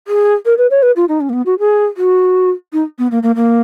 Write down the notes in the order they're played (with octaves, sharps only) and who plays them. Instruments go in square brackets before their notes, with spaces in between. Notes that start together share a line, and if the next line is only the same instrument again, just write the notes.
[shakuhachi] G#4
A#4
B4
C#5
B4
F4
D#4
C#4
A#3
B3
F#4
G#4
F#4
D#4
B3
A#3
A#3
A#3